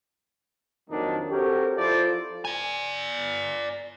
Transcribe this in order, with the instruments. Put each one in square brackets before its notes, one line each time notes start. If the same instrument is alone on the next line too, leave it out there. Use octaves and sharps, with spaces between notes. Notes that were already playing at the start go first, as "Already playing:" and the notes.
[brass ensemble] F2 D#3 F#3 A#3 D4 D#4
C4 F#4 G4 A4 A#4 C#5
F3 E4 F4 A4 C5 D5
[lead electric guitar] D5 G#5